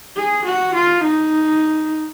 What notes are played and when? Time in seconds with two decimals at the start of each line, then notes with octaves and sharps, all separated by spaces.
0.16 G#4
0.45 F#4
0.75 F4
1.03 D#4